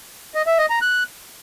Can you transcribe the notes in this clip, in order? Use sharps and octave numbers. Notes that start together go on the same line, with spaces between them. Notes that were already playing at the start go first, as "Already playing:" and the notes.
D#5
E5
D#5
A#5
F#6